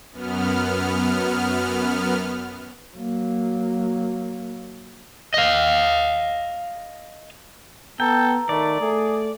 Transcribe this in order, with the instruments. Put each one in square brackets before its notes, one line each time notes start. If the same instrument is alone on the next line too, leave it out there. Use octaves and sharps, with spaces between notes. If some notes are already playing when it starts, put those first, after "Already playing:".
[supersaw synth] F#2 B3 F6
[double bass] F#3 A#3
[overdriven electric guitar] D#5 F5
[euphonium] B3 [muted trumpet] A4 [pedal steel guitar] G5 [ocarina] A#5
[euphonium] D#3 [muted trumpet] A3 [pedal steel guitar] D5
[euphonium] A3 [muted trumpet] G#4